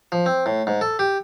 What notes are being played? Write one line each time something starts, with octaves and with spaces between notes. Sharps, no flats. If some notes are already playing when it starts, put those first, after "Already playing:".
F3
C4
A2
G#2
A4
G4